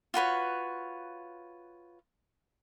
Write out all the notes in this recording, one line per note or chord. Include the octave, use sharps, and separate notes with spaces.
F4 F#4 B4 C#5